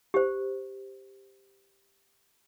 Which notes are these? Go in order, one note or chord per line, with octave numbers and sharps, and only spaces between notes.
G4 C5